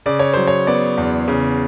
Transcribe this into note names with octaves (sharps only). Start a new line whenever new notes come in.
C#3 D5
C#5
F#3 C5
C#5
B3 D5
E2
C#3